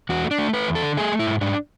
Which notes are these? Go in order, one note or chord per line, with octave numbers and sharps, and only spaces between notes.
E2 F#4
A3
D4
A3
A3 B4
E2
A4
D3
A3 G#4
A3
E4
G#2
G#2 D4